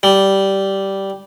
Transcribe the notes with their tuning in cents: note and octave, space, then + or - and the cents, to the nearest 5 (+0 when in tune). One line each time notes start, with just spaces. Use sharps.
G3 -10